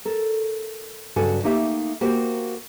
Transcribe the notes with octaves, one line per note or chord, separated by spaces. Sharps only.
A4 A#4
G2 C#3 F#3 F#4 A4 G#5
A3 A#3 D#4 G4 E5
A#3 F#4 G4 A#4 C5